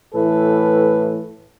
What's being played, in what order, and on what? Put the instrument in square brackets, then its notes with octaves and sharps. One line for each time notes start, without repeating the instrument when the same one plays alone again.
[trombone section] A2 E3 A4 B4